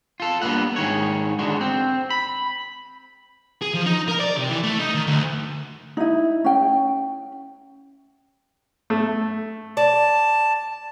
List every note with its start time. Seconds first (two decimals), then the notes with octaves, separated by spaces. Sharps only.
0.20 F4 A4
0.42 G2 E3 A#3 B3 F#5
0.76 G#2 D#3 C#5
1.39 D3 G#3 F#4
1.61 C4
2.11 B5
3.62 G#4
3.75 F3
3.86 D#4
4.08 A#4
4.20 D5
4.37 C3
4.49 E3
4.64 A3
4.79 D#4
4.94 D#3
5.07 D2
5.97 D#4 E4
6.44 C#4 G5
8.90 A3 E6
9.77 D5 A5